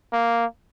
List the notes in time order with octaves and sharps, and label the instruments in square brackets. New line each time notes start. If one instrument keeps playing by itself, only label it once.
[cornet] A#3